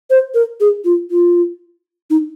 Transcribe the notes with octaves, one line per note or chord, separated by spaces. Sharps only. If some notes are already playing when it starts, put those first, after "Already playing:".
C5
A#4
G#4
F4
F4
D#4